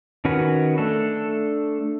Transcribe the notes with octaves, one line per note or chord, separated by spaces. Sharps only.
D#3 C#4 F#4 B4
A3 D4 A4